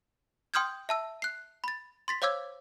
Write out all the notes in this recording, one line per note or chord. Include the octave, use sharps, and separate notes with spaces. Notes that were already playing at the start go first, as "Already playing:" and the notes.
G5 C6 D#6 F6 G6 G#6
E5 A5 E6
F#6 C7
B5 A6
C6 A6 B6
C5 C#5 F5 D6 E6 G#6